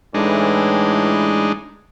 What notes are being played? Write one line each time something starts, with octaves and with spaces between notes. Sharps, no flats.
A2 E3 G#3 D4 D#4